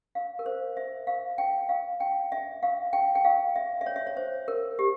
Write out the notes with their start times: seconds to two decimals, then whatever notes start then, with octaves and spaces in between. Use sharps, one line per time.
0.15 F5
0.39 A#4
0.46 C5
0.77 E5
1.07 F5
1.38 G5
1.69 F5
2.00 G5
2.32 E5
2.63 F5
2.93 G5
3.15 G5
3.25 F5
3.56 E5
3.81 E5
3.86 C#5
3.96 E5
4.07 C#5
4.17 C5
4.48 A#4
4.79 G4